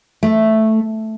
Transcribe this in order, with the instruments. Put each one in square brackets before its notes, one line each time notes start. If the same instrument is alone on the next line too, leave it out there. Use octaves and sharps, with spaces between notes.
[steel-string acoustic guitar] A3